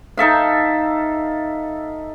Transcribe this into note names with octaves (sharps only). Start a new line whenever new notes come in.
D#4 A4 E5 F5